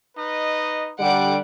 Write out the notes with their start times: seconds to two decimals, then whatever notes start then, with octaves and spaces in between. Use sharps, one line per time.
0.17 D#4 B4 D#5
1.00 D3 G3 F#5 D6 D7